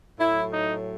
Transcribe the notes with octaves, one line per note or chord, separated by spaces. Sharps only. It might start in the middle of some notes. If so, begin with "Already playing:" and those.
A2 F#3 E4
D#4